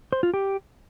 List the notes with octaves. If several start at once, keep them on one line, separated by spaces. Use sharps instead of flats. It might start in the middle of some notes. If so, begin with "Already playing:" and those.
C5
F4
G4